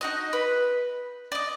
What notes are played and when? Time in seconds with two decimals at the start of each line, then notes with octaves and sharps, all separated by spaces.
0.01 D#4 F#4 D#5
0.33 B4
1.32 D5 D#5